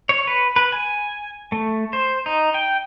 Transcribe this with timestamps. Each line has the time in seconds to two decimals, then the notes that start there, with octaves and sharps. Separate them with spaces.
0.09 C#5
0.27 B4
0.56 B4
0.72 G#5
1.52 A3
1.93 C5
2.26 D#4
2.54 G5